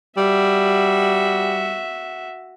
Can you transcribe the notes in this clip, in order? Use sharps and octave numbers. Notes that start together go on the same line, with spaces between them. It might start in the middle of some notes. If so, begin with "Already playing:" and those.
G3 F#4 E5